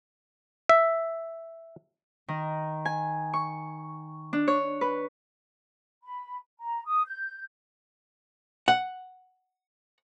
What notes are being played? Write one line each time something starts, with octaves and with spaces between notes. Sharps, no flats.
E5
D#3
G#5
C#6
D4
C#5
B4
B5
A#5
D#6
G6
F#5